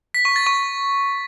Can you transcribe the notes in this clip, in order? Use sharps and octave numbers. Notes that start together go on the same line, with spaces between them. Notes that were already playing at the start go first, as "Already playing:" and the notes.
B6
C#6
A6
C#6